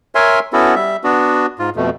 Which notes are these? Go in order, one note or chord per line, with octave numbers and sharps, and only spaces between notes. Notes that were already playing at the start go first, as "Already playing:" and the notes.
A#4 C#5 E5 G#5 C6
B3 C#4 E4 F#4 A4
G3 E5
B3 D4 F#4
G#2 F4
F2 B2 A3